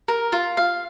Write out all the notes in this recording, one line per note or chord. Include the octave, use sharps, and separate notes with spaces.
A#4
F4
F5